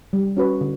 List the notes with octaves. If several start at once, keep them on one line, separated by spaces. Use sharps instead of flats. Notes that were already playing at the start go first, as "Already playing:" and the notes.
G3
C#4 F#4 B4
D3